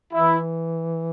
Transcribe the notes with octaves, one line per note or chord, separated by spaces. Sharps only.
E3 E4